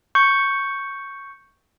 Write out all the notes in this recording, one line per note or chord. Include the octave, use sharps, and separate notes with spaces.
C#6 G6 C#7